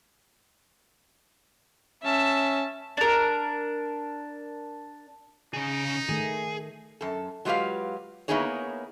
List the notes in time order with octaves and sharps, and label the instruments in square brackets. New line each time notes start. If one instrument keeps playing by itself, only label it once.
[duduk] C#4 [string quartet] E5 [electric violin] A5
[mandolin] D4 A#4
[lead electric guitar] C#3 G#4 [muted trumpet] D#4
[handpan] D#3 A3 [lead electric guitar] G#4
[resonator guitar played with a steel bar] F#2 A4
F#3 G#3 F4 G4 B4 F5
A#3 B3 D#4 E4 G#4 C#5